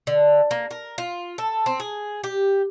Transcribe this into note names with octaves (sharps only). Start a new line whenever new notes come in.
D3
A#3
A#4
F4
A4
C4
G#4
G4